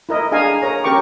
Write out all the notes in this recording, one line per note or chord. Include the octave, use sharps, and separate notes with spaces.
E4 A#4 D#5
D4 G#4 D#5 F5 G#5 A#5
A#4 C#5 A#5
C#4 G4 A#4 G5 C#6 D6